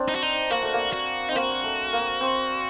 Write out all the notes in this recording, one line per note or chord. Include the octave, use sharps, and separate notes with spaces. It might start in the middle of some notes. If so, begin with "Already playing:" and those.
Already playing: C4 D4
D#4
F#4
D#4
A#3 F#4
A3
A#3
F#4
C4 D#4
A#3 F#4
A3
A#3
C4